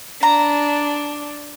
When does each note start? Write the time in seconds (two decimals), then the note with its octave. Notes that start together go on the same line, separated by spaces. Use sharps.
0.23 D4 A#5